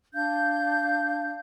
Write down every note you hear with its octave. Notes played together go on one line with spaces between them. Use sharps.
D4 F5 G6